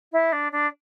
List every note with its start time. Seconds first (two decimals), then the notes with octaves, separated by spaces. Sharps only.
0.12 E4
0.32 D4
0.52 D4